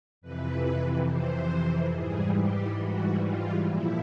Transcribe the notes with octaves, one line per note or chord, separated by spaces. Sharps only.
F2 C3 E3 B4
C5
G#2 E3 G3 G#4
G4
F#4
F4
A#2 F3 E4